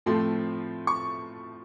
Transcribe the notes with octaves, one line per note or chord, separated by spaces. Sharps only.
A2 F3 A3 C4 C6
C#6